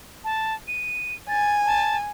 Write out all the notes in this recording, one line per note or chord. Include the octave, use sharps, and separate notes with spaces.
A5
D#7
G#5 A6
A5